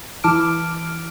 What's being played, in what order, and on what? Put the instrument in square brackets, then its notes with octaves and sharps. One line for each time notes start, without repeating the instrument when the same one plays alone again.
[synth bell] E3 E4 A5 D6 F6 D7